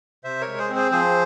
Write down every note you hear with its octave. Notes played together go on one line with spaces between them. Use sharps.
C3 C5 E5
A#4 C#5
G#3
G#4 C5
C4
G#4 C5
F3 G#4 C5